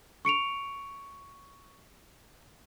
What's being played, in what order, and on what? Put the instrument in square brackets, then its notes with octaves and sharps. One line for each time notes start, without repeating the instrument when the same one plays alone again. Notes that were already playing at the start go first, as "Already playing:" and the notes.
[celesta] C#6 C#7 D7 F7